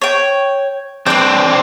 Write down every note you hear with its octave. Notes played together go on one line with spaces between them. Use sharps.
C#5 G5
C4 D4 B4 G5